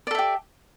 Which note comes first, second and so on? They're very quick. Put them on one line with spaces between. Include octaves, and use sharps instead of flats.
D5 A4 E5 G4